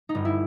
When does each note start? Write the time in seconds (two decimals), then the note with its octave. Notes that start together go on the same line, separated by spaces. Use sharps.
0.09 D#4
0.15 G1
0.25 E4